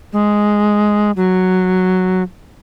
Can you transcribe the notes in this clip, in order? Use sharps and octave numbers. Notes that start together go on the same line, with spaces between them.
G#3
F#3